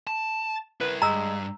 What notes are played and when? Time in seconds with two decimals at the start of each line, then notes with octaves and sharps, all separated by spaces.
0.07 A5
0.81 E4 A#4 B4
1.02 G2 G#3 A#5 E6